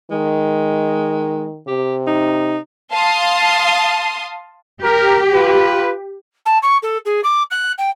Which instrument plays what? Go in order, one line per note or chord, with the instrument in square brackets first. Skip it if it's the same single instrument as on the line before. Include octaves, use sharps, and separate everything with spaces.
[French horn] D#3 [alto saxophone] G#3
[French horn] C3 [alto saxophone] G4
[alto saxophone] D#4
[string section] F5 A5 C6 D#6
[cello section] G4 [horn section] A#4
[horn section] F4 B4
[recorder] A5
C#6
A4
G#4
D6
F#6
G5